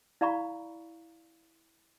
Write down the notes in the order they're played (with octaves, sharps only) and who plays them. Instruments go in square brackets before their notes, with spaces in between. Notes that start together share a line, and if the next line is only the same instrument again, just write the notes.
[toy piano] E4 D5 F5 A#5 B5 C#6